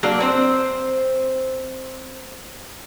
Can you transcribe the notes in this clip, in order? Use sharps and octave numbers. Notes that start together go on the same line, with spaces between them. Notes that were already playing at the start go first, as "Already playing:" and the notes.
F#3 A#3 D4
C4 C5